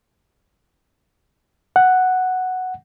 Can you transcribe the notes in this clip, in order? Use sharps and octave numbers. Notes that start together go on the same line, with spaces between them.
F#5